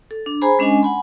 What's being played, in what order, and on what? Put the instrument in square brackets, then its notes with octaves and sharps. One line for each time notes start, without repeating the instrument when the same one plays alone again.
[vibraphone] A4
D4
G#4 C5 G#5 A#5 B5
G#3 C#4 D4 D#5 G#5
F#5 G#5 B5 C6